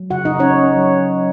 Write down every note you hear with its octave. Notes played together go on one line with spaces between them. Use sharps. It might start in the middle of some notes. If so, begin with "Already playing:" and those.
Already playing: F#3
C#3 F#4 F#5
D#4 D#5
C#3
C#4 C#5
D#4
F#3